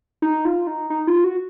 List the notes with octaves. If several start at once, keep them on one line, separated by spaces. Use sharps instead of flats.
D#4
F4
D#4
D#4
F4
F#4